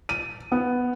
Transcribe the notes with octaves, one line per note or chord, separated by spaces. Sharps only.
D#7
B3